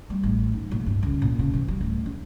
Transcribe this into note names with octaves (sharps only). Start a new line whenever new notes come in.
G3
A1
D#4
A#1
G2
C#2
A#2
C#3
E3
G3
D1
D4